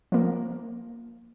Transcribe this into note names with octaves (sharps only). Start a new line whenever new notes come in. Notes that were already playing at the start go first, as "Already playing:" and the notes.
F3 A#3